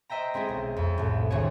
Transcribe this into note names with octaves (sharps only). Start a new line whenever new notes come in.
C5 D#5 E5 G5 A#5
G#3 C4 E4 G#4
B1
F2
C2 A2
G#1 G2 G#4 C#5